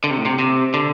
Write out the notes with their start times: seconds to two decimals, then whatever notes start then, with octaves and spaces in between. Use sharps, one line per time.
0.04 D3
0.10 C3
0.18 A2
0.25 C3
0.39 C3
0.74 D3